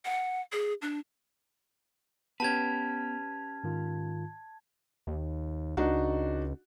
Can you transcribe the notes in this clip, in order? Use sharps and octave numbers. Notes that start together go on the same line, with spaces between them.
F#5
G#4
D4
B3 C#4 G4 B4 A5 G#6
G#2 D#3 F4
D#2
C#2 D4 D#4 F#4